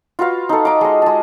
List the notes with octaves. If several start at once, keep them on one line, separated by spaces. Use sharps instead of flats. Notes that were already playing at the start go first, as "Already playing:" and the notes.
F4 F#4 B4 F5
D#4 A4
D#4 D6
G#3 D#5
G#3 A5